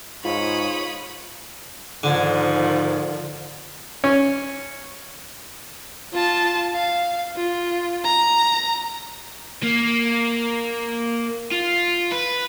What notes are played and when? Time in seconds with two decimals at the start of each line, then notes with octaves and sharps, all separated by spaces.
0.24 G#2 F4 C#5 B5 D#6
2.03 G#2 D3 D#3 F3
4.04 C#4
6.13 F4 A5
6.73 F5
7.37 F4
8.04 A#5
9.63 A#3
11.52 F4
12.12 B4